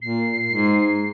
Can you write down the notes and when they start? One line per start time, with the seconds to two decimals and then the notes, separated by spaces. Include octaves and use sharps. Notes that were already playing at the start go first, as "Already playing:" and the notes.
0.02 A#2 C7
0.48 G#2